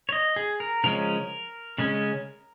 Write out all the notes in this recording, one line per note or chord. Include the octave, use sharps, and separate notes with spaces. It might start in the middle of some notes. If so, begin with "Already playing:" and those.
C#5
D#5
G#4
A#4
C#3 F3 G#3 C#4 A#4
C#3 G#3 C#4